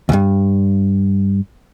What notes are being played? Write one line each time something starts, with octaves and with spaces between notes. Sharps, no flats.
D2 G2